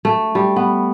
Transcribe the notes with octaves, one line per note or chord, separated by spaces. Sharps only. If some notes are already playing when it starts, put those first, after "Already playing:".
A3
G3
B3